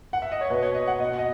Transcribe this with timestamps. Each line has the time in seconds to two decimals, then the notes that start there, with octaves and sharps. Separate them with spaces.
0.13 F#5
0.22 E5
0.32 D#5
0.41 C#5
0.50 B2 B4
0.63 C#5
0.75 D#5
0.88 F#5
1.00 B2 D#5
1.18 D#5